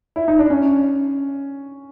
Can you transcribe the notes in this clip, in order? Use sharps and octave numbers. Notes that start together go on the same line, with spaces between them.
E4
D#4
D4
C#4